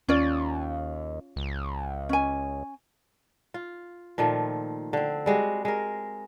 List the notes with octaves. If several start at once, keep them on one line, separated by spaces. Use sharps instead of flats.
D#2 C#4 F4 D5
C#2
C#4 G#5
F4
A#2 D#3 F3 A3
D3 C4
G3 G#3 F#4
G#3 A#4